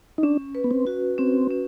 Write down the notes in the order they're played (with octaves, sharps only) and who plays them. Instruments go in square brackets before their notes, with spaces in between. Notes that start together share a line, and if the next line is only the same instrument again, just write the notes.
[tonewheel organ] D#4
[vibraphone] C#4 [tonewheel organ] D4
[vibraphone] B4
[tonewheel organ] B3
C4
[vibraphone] F#4
[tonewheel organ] C4 [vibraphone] C#4
[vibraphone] C#4